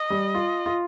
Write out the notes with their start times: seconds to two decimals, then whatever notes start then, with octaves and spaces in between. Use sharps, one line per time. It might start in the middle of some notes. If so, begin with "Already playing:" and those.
Already playing: D#5
0.10 G3
0.35 F4
0.66 F4